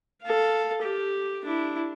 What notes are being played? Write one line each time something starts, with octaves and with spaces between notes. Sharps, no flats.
A4 F5
G4
D4 E4